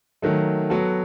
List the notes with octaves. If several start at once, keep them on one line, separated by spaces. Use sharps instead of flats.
D#3 F#3 A3
F#3 B3 F#4 A4